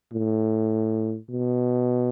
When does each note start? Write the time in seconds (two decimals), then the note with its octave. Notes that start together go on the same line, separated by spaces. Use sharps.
0.13 A2
1.30 B2